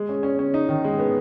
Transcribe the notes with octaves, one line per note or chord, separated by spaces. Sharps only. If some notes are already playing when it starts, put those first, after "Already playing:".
Already playing: G#3
C#4
C#4
C#4
D#4
D#3
G#3
B3